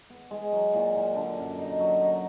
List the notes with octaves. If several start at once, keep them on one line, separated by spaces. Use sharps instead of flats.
B3
G#3
F#3
A#2
A#2
D3
F#2
D#4
F#3
D#4